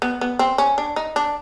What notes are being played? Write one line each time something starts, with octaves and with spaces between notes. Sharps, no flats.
B3
B3
C4
C#4
D4
D#4
D4